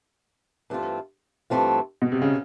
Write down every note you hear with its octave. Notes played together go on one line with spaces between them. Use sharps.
G2 E3 A3 C4 F4
G2 E3 A3 C4 F4
B2
C3
C#3